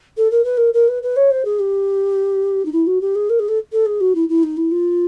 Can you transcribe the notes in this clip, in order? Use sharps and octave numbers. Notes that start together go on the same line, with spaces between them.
A4
A#4
B4
A#4
A#4
B4
B4
C#5
C5
G#4
G4
D#4
E4
F#4
G4
G#4
A#4
G#4
A4
A4
G#4
F#4
E4
E4
D#4
E4
F4